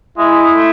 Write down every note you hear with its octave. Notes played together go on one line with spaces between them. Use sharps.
G#3 E4
A3